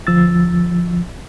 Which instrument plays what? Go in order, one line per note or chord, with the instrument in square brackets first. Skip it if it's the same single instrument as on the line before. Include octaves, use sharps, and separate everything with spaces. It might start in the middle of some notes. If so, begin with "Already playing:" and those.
[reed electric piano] D2 F3 E6 A6